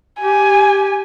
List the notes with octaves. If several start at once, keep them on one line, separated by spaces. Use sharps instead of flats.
G4 G#5